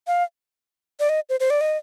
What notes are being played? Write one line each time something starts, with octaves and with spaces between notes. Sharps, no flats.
F5
D5
D#5
C5
C5
D5
D#5